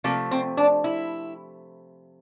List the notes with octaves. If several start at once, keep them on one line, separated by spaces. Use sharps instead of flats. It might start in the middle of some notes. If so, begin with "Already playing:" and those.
C3 F3 A3 A#3
C4
D4
E4